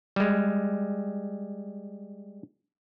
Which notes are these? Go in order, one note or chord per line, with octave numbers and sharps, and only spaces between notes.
G3 G#3